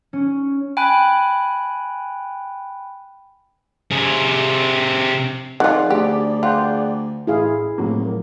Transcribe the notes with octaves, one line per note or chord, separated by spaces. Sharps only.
C#4
G5 G#5 B5 F#6
C3 G#4
F2 D#3 F4 G#4 D5 F#5
D2 G4
F4 F#5 G5
A1 E4 G#4 F5
F1 A2 F#3 A#3